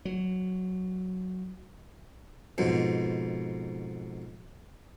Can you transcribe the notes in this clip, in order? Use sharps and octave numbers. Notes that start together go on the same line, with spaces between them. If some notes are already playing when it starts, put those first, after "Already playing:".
F#3
F2 G#2 B2